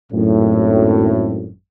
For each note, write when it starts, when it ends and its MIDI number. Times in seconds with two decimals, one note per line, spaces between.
0.12 1.49 32
0.12 1.49 42
0.12 1.49 45